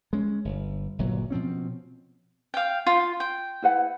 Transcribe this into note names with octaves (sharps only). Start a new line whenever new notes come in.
G#3 C#4
G1
G1 A#2 F#3
B2 F3 C4 C#4
F5 G5
F4
G5
E4 B4 F#5